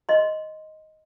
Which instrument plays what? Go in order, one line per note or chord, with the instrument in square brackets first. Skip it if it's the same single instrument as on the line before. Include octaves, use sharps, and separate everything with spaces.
[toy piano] D#5 C6